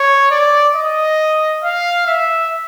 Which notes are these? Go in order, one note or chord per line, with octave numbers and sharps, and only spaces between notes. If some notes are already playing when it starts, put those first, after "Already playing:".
Already playing: C#5
D5
D#5
F5
E5